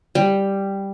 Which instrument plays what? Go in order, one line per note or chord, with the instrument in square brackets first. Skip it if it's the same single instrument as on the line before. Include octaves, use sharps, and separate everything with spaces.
[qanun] G3